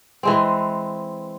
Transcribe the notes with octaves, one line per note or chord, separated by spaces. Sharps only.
E3 G#3 C4